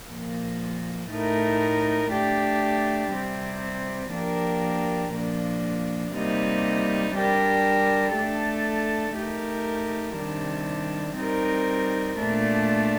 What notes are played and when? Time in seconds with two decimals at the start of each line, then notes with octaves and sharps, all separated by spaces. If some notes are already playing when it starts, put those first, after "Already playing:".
0.10 A#2 F3 A#3
1.11 A2 A3 D#4 A#4
2.11 A3 D4 G4
3.12 C3 G3 C4
4.12 F3 A#3 D4 G4 A#4
5.14 A#2 F3 A#3 D4
6.14 C3 G3 A#3 D#4
7.15 G3 D4 G4 A#4
8.15 A3 D4 A4
9.17 A3 D#4 G4 A#4
10.17 C3 D#3 G3 D4
11.18 G3 C4 D#4 A#4
12.19 A#2 A3 D4